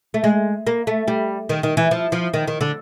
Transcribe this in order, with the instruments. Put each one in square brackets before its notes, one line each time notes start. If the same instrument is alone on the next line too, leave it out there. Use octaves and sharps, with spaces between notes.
[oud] A3
G#3
A#3
A3
G3
D#3
D#3
E3
F3
F3
D#3
D#3
D3